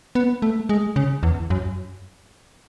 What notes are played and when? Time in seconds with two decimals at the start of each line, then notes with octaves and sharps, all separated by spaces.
0.15 B3
0.42 A3
0.69 G#3
0.96 C#3
1.23 E2
1.50 F#2